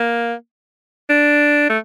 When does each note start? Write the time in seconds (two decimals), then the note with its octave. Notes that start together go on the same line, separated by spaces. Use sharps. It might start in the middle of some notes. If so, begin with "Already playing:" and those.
Already playing: A#3
1.09 D4
1.69 A3